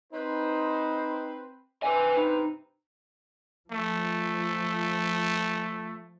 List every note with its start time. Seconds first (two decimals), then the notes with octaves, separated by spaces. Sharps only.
0.13 C4 D#4 B4 C5
1.83 G2 C3 C4 B4 G#5
2.16 D#4 B4
3.72 F3 A3